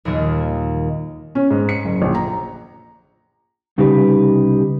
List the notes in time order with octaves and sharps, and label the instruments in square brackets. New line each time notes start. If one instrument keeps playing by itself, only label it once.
[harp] D#2 A#2 D#3 G3 A#3
[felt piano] C#4
G#2
C#7
F#1
A#1
A#5
[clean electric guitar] C2 C#3 G3 D#4 G4 B4